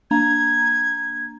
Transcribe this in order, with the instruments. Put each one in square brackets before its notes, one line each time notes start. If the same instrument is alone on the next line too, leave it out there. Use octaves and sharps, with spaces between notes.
[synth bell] A#3 D4 A#5 [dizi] G#6